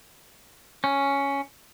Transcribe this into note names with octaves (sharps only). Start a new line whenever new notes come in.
C#4